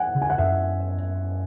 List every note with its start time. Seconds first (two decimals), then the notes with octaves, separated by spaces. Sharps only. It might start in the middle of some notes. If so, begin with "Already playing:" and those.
Already playing: F#5 G#5
0.15 C#3
0.22 G#5
0.30 F#5
0.38 F#2 E5